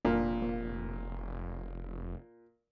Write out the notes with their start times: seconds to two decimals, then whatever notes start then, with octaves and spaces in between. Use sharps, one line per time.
0.05 F1 A#2 D4 A#4
0.42 A#3